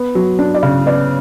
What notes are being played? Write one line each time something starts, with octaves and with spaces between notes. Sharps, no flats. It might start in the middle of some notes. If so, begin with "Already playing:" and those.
Already playing: B3
F#3
D4
D5
C#3
B3 D5